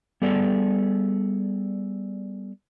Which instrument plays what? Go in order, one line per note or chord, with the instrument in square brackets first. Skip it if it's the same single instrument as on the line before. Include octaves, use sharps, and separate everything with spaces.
[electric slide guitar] G3 B3 G#4 A4 D5